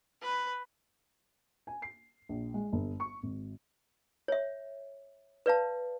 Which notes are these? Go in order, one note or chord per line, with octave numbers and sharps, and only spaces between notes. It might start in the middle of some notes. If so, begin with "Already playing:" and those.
B4
G#5
C7
A#1
G#3
G1
C#6
G#1
C#5 E5
B4 D5 F5 A5